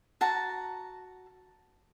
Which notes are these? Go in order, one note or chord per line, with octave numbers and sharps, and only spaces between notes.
F#4 A5 A#5